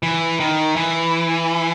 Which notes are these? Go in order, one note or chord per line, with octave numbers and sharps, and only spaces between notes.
E3
D#3
E3